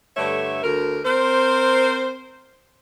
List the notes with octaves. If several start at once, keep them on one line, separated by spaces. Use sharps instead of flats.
G2 D3 A3 C#5 E5
D2 A#4
C4 A#4 C5